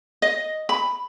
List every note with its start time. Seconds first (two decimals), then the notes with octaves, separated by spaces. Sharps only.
0.22 D#5
0.69 B5